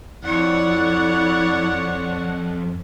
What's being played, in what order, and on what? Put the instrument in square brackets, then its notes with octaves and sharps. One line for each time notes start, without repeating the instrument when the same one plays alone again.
[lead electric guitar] F2 [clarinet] E4 [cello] C#5 D5 [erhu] F#5